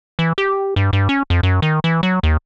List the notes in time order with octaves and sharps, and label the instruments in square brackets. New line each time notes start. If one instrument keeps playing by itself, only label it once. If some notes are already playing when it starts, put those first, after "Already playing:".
[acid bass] E3
G4
G2
G2
C#4
F2
F#2
D#3
E3
F#3
D#2